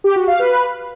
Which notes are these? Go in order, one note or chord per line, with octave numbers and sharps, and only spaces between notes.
G4
F#4
F5
B4